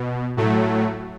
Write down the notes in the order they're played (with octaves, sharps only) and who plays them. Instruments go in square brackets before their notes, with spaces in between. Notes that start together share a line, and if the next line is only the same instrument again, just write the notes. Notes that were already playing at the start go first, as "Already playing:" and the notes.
Already playing: [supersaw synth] B2
A2 F#3 A3